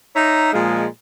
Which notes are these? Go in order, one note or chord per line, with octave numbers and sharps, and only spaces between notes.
D#4 C#5 E5 A#5
A#2 F3 G#3